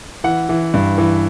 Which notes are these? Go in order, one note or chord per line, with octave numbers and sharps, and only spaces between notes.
E3 F#5
E3
G2
E3